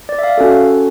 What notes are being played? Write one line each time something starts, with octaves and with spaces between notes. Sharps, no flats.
D5
E5
F5
C#4 F#4 A4